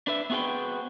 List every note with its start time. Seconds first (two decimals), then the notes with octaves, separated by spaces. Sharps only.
0.07 D4 B4 E5
0.30 B3 C4 F#4 G#4 B4 G5